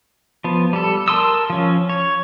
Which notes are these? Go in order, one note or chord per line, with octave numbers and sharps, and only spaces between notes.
F3 B3
G3 A4
A#4 A5 C6 D#6 E6
F3 C#4
C#5